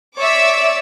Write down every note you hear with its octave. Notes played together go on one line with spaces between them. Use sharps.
C#5 D5 E5 D6 E6